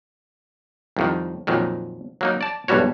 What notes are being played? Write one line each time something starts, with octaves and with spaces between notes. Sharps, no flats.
C2 F2 D#3
F2 A#2 D#3 F#3
F#3 A#3 D#4
D5 A5
B1 E2 G2 G3 F#4 C#5